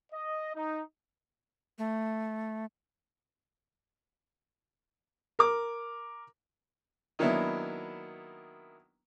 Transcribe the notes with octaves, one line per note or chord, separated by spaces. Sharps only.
D#5
D#4
A3
A#4 D6
D#3 F#3 A#3 B3 D4 E4